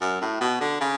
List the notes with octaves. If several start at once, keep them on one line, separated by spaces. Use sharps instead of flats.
F#2
A2
B2
D3
C#3